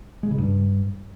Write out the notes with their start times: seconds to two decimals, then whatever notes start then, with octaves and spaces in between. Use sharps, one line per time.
0.23 G#3
0.31 C#3
0.38 G2